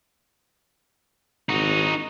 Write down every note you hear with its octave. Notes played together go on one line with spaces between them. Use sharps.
G#1 D#4 F#4